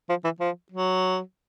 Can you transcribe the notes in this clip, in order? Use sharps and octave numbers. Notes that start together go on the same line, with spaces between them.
F3
E3
F3
F#3